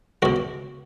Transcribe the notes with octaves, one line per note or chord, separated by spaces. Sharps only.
C#2 B2 F#4